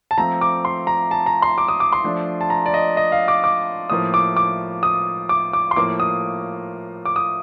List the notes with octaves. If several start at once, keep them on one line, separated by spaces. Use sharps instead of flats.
A5
F3 A3 C4 F4 A#5
D6
C6
A#5
A5
A#5
C6
D6
D#6
D6
C6
F3 A3 D4
A5
A#5
D5
D#5
D#5
F5
D6
D6
A2 F3 A#3 D#6
D6
D6
D#6
D6
D6
C6
A2 F3 A#3 D6
D#6
D6
D#6